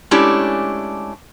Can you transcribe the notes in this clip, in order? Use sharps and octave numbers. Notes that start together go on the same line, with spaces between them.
G#3 A3 C#4 D4 E4 G4